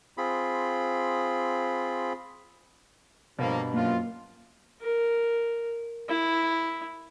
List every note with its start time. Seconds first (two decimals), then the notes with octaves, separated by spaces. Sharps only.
0.18 C4 F4 G#4 B5
3.39 G2 B2 F3 A#3
3.74 F#2 F3 A#3 F4
4.82 A#4
6.09 E4